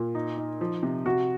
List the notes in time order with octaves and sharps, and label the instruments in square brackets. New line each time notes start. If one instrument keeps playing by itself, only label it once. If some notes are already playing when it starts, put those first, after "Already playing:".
Already playing: [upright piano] A#2 [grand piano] F4
[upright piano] D#4
D#4
F3
C3
[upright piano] C3 [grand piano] F#4